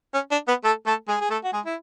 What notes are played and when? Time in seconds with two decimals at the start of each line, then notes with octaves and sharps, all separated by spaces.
0.14 C#4
0.32 D4
0.48 B3 B4
0.64 A3 A4
0.86 A3 A4
1.08 G#3 G#4
1.21 G#4
1.30 A3 A4
1.44 F#4
1.53 G#3 G#4
1.65 E4